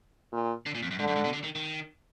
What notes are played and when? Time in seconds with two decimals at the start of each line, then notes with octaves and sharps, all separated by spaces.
0.32 A#2
0.66 D3
0.75 A#2
0.83 F2
0.91 F#2
0.99 G#2 D3
1.08 F#2
1.16 G#2
1.25 B2
1.33 D3
1.44 D#3
1.55 D#3